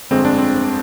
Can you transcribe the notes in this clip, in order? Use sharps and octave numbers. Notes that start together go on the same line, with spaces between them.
G1 F2 D3 G#3 C4
D4
C4